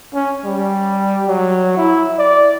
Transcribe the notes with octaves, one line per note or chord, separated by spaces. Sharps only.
C#4
G3
F#3
E4
D5